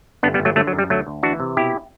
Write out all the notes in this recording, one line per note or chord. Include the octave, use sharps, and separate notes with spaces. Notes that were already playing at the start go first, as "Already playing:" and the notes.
G1 B3 D4
G3 B3
G1
F#3 A3
D3 F#3 A3
F#3
F#2
G3
D2 F#3 A3
D2
E3 D4 F#4
C3
B2 E4 G4